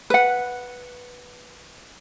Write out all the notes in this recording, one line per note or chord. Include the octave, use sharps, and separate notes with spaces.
B4 F#5